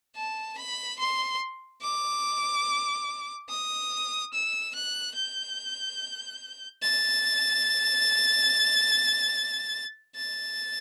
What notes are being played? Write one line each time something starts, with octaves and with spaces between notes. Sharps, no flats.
A5
B5
C6
D6
D#6
E6
F#6
G6
A6
A6